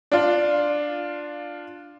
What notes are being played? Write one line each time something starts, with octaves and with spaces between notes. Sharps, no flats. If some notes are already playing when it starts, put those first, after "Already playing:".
D4 F4